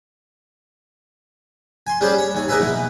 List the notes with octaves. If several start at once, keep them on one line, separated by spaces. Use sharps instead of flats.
G#5 C6
G3 C#4 D4 G#4 C5
C#5
D#2 G#5
E2 A#3 D#4 B4 E5 G#5
B2 E3 B3